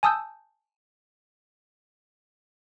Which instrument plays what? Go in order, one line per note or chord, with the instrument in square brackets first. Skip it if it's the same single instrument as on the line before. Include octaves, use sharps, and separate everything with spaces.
[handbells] G#5 A5 D#6 E6 G6